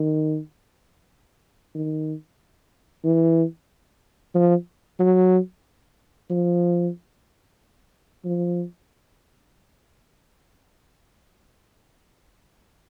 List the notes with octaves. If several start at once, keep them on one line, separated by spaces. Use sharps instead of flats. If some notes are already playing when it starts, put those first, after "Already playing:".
Already playing: D#3
D#3
E3
F3
F#3
F3
F3